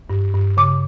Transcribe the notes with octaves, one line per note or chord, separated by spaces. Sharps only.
G2
G2
C#3 D6